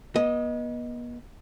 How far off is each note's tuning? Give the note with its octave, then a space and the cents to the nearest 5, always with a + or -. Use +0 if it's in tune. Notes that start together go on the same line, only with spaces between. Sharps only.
B3 -40 D#5 +0